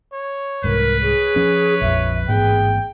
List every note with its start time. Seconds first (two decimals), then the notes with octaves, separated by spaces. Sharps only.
0.13 C#5
0.64 C2 G#2 A#4 B4
1.03 G#4 C#5
1.36 F3 C#4
1.81 A#1 F2 F3 E5
2.29 A1 G#2 B3 G#4 G5